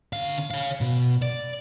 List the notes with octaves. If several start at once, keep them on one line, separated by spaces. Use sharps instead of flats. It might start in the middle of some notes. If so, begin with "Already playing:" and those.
D3 F5
C#5 F5
B2
D5